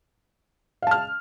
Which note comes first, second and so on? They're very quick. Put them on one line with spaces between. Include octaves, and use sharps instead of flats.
F5 A5 F6